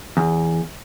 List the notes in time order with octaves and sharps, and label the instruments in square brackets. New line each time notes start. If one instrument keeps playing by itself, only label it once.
[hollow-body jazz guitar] E2